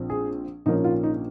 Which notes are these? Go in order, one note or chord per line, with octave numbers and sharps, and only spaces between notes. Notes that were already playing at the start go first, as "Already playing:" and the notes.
Already playing: A#1 F3 C4
G#4
A#1 G#2 F3 A#3 C#4 D#4
F4
D#4